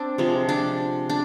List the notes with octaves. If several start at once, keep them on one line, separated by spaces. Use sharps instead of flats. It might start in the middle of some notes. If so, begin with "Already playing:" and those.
Already playing: C4 D4
C3 F3 G#3
D4
D4